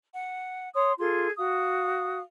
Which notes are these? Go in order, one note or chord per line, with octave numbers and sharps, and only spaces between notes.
F#5
C#5 C6 D#6
F4 G#4 A4 C6
F#4 F5 D#6